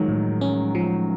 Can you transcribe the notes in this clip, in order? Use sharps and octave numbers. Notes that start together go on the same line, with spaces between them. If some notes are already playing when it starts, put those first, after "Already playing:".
Already playing: D#3 F3 F#3 G#3
A2
C#4
F3